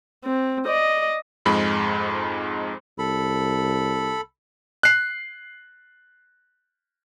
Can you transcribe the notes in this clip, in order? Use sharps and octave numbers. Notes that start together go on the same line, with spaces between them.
C4
D5 D#5
F2 G#2 G#3 B5
C2 A4 B5
F#6 C7